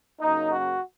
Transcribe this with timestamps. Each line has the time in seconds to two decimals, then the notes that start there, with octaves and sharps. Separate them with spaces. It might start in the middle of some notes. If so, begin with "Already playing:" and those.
0.20 F#2 C#3 A#3 D#4
0.49 F#4